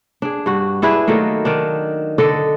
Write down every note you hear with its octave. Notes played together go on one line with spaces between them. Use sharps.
D4 G#4
G2 F#4
D4 E4 G#4 B4
D#3 F#3 A3 A#3
D#3 D4
D3 A4 D5 D#5